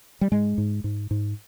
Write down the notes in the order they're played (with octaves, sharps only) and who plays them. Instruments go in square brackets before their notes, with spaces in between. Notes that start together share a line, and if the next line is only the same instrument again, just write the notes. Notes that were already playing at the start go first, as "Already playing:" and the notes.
[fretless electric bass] G3
G#2 G#3
G#2
G#2
G#2